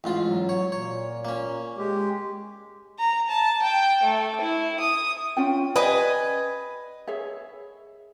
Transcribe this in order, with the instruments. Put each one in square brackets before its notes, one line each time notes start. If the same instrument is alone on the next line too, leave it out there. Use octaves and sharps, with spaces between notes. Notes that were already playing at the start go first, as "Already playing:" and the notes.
[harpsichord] A1 G#2 F4
[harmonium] F#3
[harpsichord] C#5
[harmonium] A#2 [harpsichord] C#5
[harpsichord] A#3 C#4
[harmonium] G#3 G4
[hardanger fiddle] A#5
A5
G5
A3
E4
D#6
[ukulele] C#4 F4 G5
[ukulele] G4 C5 D5 [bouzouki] B4 D#5 G#5
[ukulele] G#4 C#5 E5